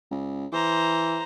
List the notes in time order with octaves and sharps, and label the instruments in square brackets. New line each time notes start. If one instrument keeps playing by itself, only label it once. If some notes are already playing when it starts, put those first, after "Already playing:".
[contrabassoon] C#2
[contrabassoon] E3 [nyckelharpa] C5 A#5